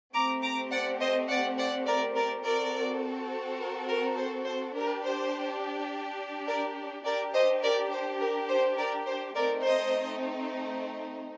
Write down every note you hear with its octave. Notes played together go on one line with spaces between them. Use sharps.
A3 C4 G4 A#5 D6
A#5 D6
D5 F#5
C5 D#5
D5 F#5
D5 F#5
A#4 D5
A#4 D5
C4 F#4 A4 A#4 D5
A#4
A#4
C5
C5
D4 G4 A#4
C5
A#4 D5
D4 G4 A#4 D5
C5 D#5
A#4 D5
C5
A#4
C5
A#4 D5
C5
A3 C4 D#4 A#4 D5
C5 D#5